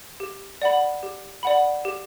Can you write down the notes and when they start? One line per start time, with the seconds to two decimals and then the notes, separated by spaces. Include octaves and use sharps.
0.20 G4
0.62 D5 F#5 B5
1.03 G4
1.43 D5 F#5 B5
1.85 G4